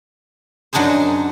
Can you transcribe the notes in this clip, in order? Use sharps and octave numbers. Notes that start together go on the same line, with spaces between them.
F#2 F#3 D4 D#4 G#4 C5